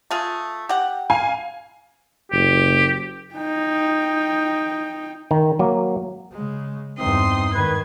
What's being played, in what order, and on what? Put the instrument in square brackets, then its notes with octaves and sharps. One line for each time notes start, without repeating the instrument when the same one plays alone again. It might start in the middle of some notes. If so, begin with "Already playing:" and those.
[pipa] A3 F4 G#4
G4 F#5
[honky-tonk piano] F5 G#5
[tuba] F#1 [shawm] G4
[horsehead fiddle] D#4 G5
[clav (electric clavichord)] D#3
F#3 A#3
[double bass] C#3 G#3
[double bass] E2 G2 [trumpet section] C4 D#4 [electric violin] C6 D#6
[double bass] G#2 D#3 [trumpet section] B4 [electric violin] G#6